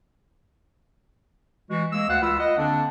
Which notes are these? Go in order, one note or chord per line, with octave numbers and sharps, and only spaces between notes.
E3 G#3 F#4
G#3 A#3 E6
D2 F5 F#5
C#2 F4 B5 E6
D#5 F#5
D3 A#3 C4 D4